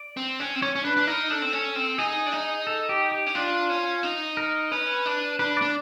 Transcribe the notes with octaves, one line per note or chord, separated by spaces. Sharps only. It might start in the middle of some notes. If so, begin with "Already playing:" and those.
Already playing: D5
C4
C#4
C4
C#4 C#5
C#4
D4 B4
D4
D#4 A#4
D4 A4
C4
C#4
C4
D#4 G#4
D4
D#4
A4
G4
G4
C#4
D4 F4
C#4
D#4
A#4
C#4 B4
D4
D4 B4
D5
D4